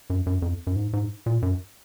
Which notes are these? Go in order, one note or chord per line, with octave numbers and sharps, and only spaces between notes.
F#2
F#2
F2
F#2
G#2
G#2
A#2
F#2